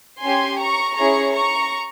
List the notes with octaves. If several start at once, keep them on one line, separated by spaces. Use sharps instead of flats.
C#4 G4 G#5 C6
A#5 C#6
C#4 E4 G#4 A#5 C#6
A#5 C#6